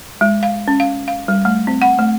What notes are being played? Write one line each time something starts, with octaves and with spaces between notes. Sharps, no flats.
G#3
F5
C#4
F5
F5
G3
A3
C4
F#5
A3